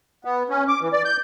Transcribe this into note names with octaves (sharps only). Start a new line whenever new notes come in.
B3
C#4
D6
E3
D5
G6